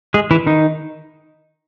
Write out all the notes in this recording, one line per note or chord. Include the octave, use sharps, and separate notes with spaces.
G#3 G#4
E3 E4
D#3 D#4